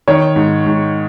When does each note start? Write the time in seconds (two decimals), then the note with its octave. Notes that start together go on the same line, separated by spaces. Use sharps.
0.08 D#3 C#5
0.36 G#2
0.66 G#2